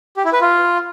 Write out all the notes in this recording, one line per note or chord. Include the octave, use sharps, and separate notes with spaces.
G4
E4
B4
F4